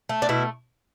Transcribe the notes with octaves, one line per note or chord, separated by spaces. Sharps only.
A3
D4
B2 E4